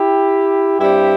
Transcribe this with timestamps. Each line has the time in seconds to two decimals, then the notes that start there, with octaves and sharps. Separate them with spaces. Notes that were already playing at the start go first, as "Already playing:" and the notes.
Already playing: E4 G4
0.80 G2 G3 C4 E4 G4